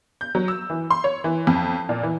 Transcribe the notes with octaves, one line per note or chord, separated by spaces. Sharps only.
G6
F#3
E6
E3
C6
C#5
E3
F2
A#2
E3